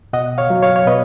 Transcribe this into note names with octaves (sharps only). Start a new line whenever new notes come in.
B2 D#5 F#5
C#5 F5
F#3
C#5 F5
C#5
B2 B4 D#5